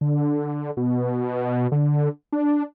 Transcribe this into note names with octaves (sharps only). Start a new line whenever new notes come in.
D3
B2
D3
D4